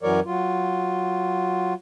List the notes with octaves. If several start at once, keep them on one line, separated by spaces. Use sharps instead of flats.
F#2 E3 F#3 A#4 C#5 D5
F#3 F4